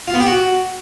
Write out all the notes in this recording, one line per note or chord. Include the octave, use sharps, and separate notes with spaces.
F4
B3
G4
F#4